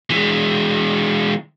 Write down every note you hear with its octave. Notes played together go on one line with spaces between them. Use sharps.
E3 G#3